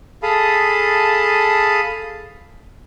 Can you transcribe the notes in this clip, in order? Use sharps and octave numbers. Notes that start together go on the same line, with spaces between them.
G#4 A4 F5 A5 B5 D#6